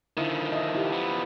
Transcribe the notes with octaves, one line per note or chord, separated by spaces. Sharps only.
D3 D#3 F3 E4 E5
D#5 E5
E4 G4
F3 B3